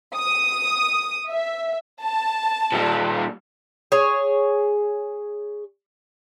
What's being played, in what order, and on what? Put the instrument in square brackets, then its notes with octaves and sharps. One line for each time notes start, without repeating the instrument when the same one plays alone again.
[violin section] D#6
E5
A5
[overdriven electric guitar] A#2 G3
[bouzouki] G#4 C#5